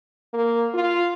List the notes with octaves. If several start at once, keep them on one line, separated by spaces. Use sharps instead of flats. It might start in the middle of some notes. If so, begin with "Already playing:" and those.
A#3
F4